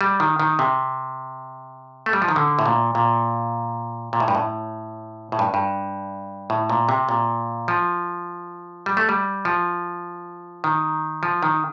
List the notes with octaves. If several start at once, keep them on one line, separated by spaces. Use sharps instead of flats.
G3
D#3
D#3
C3
A3
G3
F3
D#3
D3
A2
A#2
A#2
A#2
A2
G2
A2
A2
G2
G2
A2
A#2
C3
A#2
F3
G3
A3
G3
F3
D#3
F3
D#3